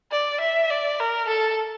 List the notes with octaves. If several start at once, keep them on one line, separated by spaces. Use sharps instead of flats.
D5
E5
D5
A#4
A4